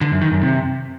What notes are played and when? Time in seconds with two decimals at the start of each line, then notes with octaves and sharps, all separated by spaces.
0.01 D3
0.11 F#2
0.21 D#3
0.32 F#2
0.42 C3